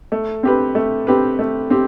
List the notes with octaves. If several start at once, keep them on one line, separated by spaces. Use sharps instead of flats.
A3
C4 G4 B4
A3
C4 G4 B4
A3
C4 G4